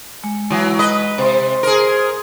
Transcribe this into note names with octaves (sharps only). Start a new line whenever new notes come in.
G#3
E3 F#3
B4 D#5
C3 C5 C6
G#4 A#4